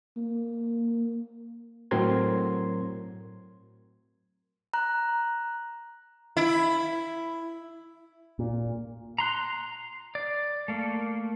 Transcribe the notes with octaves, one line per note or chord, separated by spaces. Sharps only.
A#3
A2 F#3 C4 A#4 C6 G#6
A#5 F#6
E4
A#2
A#5 C6 F#6
D5
A3 A#3